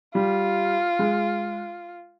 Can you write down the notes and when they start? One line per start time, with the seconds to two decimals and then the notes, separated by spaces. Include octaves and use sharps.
0.14 G3 F4
0.99 G#3